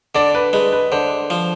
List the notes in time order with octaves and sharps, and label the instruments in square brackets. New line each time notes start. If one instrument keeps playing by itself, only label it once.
[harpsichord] D3 [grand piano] D5
[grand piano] B4
[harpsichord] G#3 [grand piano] B4
[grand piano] B4
[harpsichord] D3 [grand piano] C5
[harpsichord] F3